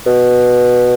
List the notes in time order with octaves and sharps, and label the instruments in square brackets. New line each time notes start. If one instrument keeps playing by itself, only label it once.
[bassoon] B2